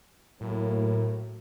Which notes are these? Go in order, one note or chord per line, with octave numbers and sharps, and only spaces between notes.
A2 F#3 A#3 A#4